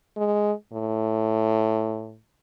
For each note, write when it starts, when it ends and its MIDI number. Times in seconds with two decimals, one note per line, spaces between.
0.17 0.52 56
0.73 2.18 45